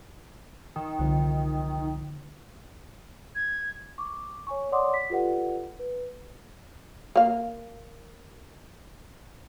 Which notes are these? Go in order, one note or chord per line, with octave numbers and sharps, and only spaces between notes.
D#3
C2 D3 F3
G#6
C#6 D6
C#5 G#5 C#6
C#5 D5 F#5 C6 D6 D#6
B6
F4 G4 A4 B4 D5 F#5
B4
A#3 F5